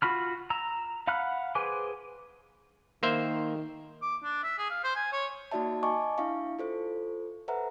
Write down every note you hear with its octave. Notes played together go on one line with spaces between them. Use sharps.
F4 F#4 B5 F6
A#5 E6
F5 F#5 B5 F6 F#6
G#4 B4 C5 G#5 D6
D#3 A#3 C5 E5
D6
D4
E5
G#4
F5
C5
G#5
C#5
A#3 D#4 F#4 D5 E5 A5
D#5 G#5 A5 C#6 D6
D4 E4 E5 F5 C#6
F4 A4 C5
A4 B4 C5 E5 F#5 A#5